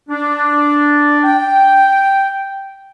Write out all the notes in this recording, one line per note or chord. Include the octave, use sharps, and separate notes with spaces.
D4
G5